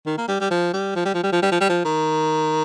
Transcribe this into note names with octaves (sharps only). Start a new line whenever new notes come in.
D#3
A#3
G3
G3
F3
G3
F3
G3
F3
G3
F3
G3
F3
G3
F3
D#3